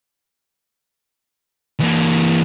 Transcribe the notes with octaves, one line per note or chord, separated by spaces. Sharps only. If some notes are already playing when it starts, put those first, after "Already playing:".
E3 A#3